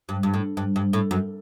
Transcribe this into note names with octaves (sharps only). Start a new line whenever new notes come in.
G2
G2
A2
G2
G2
A2
F#2